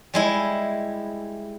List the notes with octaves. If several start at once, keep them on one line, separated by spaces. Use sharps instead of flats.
G3 G#3 E4